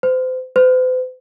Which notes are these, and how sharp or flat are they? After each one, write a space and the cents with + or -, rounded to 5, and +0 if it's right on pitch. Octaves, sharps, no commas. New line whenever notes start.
C5 -35
C5 -45